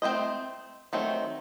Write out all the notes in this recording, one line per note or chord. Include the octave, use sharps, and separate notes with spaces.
A3 C4 F4 C5 D#5
D#3 F#3 A3 C4